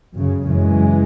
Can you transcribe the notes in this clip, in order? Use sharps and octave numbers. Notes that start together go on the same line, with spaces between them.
F#2 C#3
F#2 C#3 E3 G#3